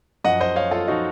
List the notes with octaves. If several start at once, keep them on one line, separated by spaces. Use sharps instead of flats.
F#2 F3 D#5 F#5
C5 D#5
C#5 F5
F4 A4
F3 D#4 F#4